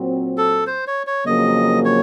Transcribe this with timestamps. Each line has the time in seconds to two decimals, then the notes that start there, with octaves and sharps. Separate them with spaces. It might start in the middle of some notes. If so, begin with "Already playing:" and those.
Already playing: A#2 F#3 C4
0.38 A4
0.67 C5
0.87 C#5
1.07 C#5
1.26 F2 C#3 F#3 A#3 D#5
1.85 C#5